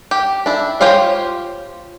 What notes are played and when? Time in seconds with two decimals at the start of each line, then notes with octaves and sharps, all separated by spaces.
0.11 G4
0.46 D4 E4
0.81 F4 G4 C5 C#5 F5